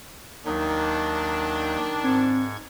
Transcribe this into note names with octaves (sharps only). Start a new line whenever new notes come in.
D#2 D#3 F#3 D4 D#4
G#2 C4 C#6 G#6